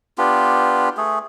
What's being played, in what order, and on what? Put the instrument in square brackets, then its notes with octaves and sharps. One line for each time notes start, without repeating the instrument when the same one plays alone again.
[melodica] B3 D4 F4 G4
A3 G#4